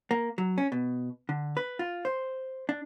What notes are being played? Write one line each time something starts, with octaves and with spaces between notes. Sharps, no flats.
A#3
F#3
C#4
B2
D3
B4
F4
C5
D4